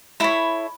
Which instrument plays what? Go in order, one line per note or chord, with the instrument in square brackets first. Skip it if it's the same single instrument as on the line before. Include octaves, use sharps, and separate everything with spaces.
[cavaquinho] E4 A4 C#5 B5